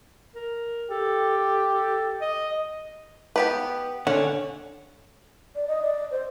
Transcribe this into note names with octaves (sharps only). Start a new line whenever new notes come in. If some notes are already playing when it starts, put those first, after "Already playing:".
A#4
G4 A4
A4
A4
D#5
B3 G4 B4
D3 C#4 F#5
D5
D#5
D5
C5